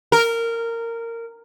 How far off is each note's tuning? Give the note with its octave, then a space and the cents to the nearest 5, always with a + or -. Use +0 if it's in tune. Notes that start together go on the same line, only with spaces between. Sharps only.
A#4 -15